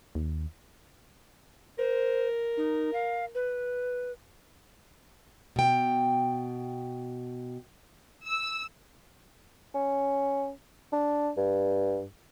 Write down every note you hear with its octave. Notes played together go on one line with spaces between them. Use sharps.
D#2
A#4 C5
D#4
F5
B4
B2 G5
E6
C#4
D4
G2